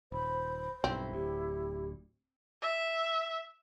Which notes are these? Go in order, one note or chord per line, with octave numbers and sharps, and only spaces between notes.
D#1 C5 B5
B1 G2 C4 E4
D1 D2 G4
E5